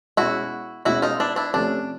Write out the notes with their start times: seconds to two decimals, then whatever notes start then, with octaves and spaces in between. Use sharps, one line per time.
0.17 B2 G#3 C#4 E4 F#4
0.85 B2 G#3 C#4 E4 F#4
1.02 D#4 F4
1.20 D4 E4
1.36 D4 E4
1.54 C3 F3 A3 C#4 D4